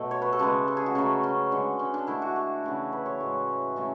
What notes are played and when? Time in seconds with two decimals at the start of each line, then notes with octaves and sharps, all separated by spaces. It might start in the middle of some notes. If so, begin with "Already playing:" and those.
Already playing: B2 F#3 A3 A4
0.11 C#5
0.22 B4
0.33 A4
0.39 C#3 G#3 B4
0.68 A4
0.77 G#4
0.86 F#4
0.95 C#3 F#3 A3
1.23 C#4
1.52 D3 G#3
1.79 C#4
1.94 D4
2.07 D3 A3 E4
2.22 F#4
2.36 A4
2.64 C#3 E3 A3
2.92 B4
3.06 C#5
3.20 A2 G#3
3.76 C#3 E3 A3